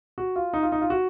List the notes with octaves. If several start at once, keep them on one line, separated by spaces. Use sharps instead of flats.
F#4
F4
D#4
F4
D#4
F4
F#4